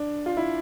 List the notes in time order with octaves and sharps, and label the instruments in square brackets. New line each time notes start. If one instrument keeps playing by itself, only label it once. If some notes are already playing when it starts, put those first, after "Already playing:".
Already playing: [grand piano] D4
F4
E4